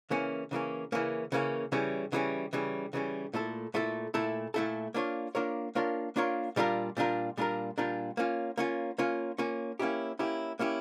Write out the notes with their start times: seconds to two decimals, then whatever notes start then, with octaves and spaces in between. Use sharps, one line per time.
0.10 C#3 E3 A#3 C#4
0.51 C#3 E3 A#3 C#4
0.92 C#3 E3 A#3 C#4
1.32 C#3 E3 A#3 C#4
1.72 C#3 E3 G3 C#4
2.12 C#3 E3 G3 C#4
2.53 C#3 E3 G3 C#4
2.93 C#3 E3 G3 C#4
3.34 A#2 A3 E4 A4
3.74 A#2 A3 E4 A4
4.14 A#2 A3 E4 A4
4.54 A#2 A3 E4 A4
4.94 A#3 D4 F4 A#4 C#5
5.35 A#3 D4 F4 A#4 C#5
5.75 A#3 D4 F4 A#4 C#5
6.16 A#3 D4 F4 A#4 C#5
6.56 A#2 G3 D4 F4 A#4
6.97 A#2 G3 D4 F4 A#4
7.37 A#2 G3 D4 F4 A#4
7.78 A#2 G3 D4 F4 A#4
8.17 A#3 C#4 F4
8.57 A#3 C#4 F4
8.98 A#3 C#4 F4
9.38 A#3 C#4 F4
9.79 A#3 C#4 E4 G4
10.19 A#3 C#4 E4 G4
10.59 A#3 C#4 E4 G4